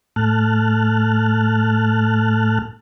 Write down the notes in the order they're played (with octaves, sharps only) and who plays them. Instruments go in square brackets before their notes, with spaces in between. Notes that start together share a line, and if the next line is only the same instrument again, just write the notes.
[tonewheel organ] A2 A3 A5 F6 F#6